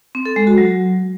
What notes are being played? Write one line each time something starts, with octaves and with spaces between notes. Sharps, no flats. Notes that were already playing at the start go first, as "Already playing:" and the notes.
C4
A4
G#3
F#4
F#3